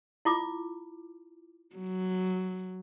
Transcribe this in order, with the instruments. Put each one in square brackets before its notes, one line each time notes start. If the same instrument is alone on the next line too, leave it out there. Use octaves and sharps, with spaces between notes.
[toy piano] E4 F4 D6
[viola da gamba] F#3